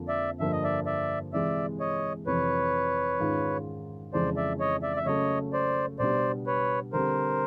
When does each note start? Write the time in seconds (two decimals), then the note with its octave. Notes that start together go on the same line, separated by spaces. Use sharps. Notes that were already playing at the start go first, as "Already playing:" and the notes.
Already playing: F2 D3 F3 A#3
0.08 D5 E5
0.40 G2 D3 F3 A#3 E5
0.52 D#5
0.64 D5 E5
0.86 D5 E5
1.33 C3 E3 G#3 D5 E5
1.80 C#5 D#5
2.26 F2 C3 E3 B4 C#5
3.19 G#2 D#3 G#3 C#4 F4
4.13 F2 C#3 E3 G#3 C5 D5
4.36 D5 E5
4.60 C#5 D#5
4.83 D5 E5
4.97 E5
5.06 C#3 F#3 A3 C#4 C#5 D#5
5.53 C5 D5
5.99 B2 G3 B3 D4 C5 D5
6.46 B4 C#5
6.93 D3 G3 C4 A#4 C5